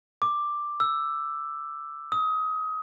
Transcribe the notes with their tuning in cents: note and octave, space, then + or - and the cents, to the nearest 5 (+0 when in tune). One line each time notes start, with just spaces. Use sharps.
D6 +5
E6 +10
D#6 +25